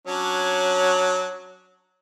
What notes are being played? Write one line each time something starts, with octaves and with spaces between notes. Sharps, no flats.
F#3 C#4 D4